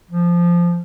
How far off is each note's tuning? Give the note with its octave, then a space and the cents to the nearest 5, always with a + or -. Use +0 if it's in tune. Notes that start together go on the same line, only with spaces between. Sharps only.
F3 -10